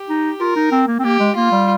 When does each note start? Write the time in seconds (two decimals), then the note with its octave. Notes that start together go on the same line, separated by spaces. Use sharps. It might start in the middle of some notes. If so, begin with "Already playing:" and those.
Already playing: G4
0.09 D#4
0.40 F4 A#4
0.56 D#4
0.72 C4
0.88 A#3
0.99 C4
1.04 A#3 G4
1.20 G#3
1.36 A#3 F4
1.52 G3